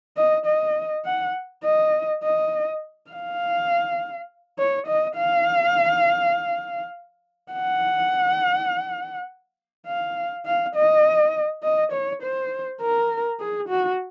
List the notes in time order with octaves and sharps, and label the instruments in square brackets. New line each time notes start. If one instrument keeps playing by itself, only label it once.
[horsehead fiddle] D#5
D#5
F#5
D#5
D#5
F5
C#5
D#5
F5
F#5
F5
F5
D#5
D#5
C#5
C5
A#4
G#4
F#4